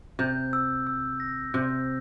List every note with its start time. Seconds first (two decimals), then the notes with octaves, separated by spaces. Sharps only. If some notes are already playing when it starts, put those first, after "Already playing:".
0.19 C3 G6
0.53 E6
0.87 E6
1.20 A#6
1.54 C3 G6